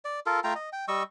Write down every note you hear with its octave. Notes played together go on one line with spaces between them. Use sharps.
D5
F4 A4 A#4
A3 F4 G5 A#5
D#5
G5
G3 D#5 C#6 E6